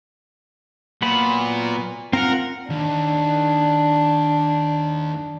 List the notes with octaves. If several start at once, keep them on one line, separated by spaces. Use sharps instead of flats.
A#2 F#3 B3 B5
C4 F4 A#4 F#5
D#2 D4